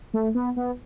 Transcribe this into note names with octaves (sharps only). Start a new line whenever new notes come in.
A3
B3
B3